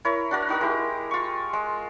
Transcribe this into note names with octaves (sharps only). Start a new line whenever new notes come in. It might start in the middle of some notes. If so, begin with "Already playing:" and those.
E4 A#4 C#5
D4 F#4 A#4
D#4 F#4 A#4
G#3 E4 G4
F4 C#6
G#3